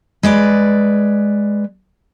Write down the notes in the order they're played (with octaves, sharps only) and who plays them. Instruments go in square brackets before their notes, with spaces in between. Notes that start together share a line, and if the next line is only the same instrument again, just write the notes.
[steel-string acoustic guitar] G#3 B4 D5